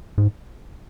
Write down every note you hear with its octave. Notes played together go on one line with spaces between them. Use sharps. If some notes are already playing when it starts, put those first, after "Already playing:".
G#2